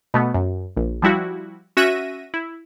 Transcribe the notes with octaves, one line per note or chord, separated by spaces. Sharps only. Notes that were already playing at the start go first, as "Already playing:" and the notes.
B2 A3 B3
F#2
A#1
F3 G3 E4 F#4
C#4 F#4 E5 A#6 D#7
E4